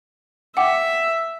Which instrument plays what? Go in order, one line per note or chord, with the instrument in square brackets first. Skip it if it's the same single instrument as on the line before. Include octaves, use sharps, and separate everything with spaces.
[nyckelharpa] E5 [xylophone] F#5 G5 D6